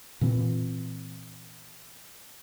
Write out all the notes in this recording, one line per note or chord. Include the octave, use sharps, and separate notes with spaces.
A#2 E3 C4